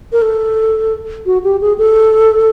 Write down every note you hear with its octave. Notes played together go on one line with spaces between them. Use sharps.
A#4
A4
F#4
G4
G#4
A4